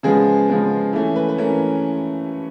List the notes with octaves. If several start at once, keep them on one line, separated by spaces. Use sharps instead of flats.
C#3 F3 G#3 B3 G#4
C#3 F3 G#3 B3
E3 A3 C#4
B4
B4
E3 A3 C#4 A#4